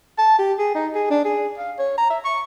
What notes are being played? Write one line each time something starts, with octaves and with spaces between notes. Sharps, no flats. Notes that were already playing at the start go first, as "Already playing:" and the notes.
A5
G4
G#4
D#4
G#4
D4
G#4
F5
C#5
A#5
E5
C#6